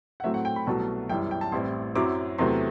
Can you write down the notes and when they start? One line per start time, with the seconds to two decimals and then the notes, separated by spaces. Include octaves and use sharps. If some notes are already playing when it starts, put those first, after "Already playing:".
0.20 F#5
0.24 A2 F#3 A3 C4 E5
0.34 F#5
0.45 G5
0.56 B5
0.67 C2 B2 F#3 A3 A5
1.09 G1 F#2 E3 G3 G5
1.31 G5
1.41 A5
1.52 A1 A2 G3 C4 E4 C6
1.95 F#2 F#3 C4 E4 D6
2.38 E2 C3 F#3 A3 C6